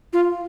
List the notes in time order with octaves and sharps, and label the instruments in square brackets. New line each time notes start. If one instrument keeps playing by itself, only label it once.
[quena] F4